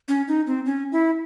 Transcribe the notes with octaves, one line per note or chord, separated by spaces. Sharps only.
C#4
D#4
C4
C#4
E4